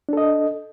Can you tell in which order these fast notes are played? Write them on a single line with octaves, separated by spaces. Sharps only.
D4 A4 D#5